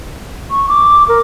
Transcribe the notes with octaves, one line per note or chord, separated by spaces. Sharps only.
C#6
D6
A#4